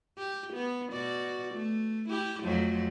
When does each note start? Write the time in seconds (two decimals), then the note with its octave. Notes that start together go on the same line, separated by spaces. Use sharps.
0.18 G4
0.54 B3
0.92 B2 F#4 D5
1.55 A3
2.09 E4 G4
2.43 F2 F#3 A3